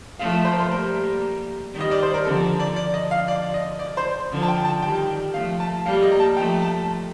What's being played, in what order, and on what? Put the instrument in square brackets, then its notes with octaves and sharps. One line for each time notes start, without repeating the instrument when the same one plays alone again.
[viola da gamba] F3 A3 [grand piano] F5
[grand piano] C5
A#4
C5
[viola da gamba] G3 A#3 [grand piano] A#4
[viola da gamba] D#3 G3
[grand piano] D#5
D5
C5
A#4
[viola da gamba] D3 F3 [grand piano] A4
[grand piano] D5
[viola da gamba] D3 F3 [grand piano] D5
[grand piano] D#5
F5
D5
D#5
D5
C5
[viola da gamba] D3 F3
[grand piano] A5
G5
A5
[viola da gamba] D#3 G3 [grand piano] G5
[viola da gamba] F3 A3 [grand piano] F5
[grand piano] A5
[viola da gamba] G3 A#3 [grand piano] F5
[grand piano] D#5
A#5
A5
[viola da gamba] F3 A3 [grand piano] G5
[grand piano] A5